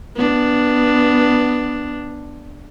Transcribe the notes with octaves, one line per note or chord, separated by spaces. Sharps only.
B3 D4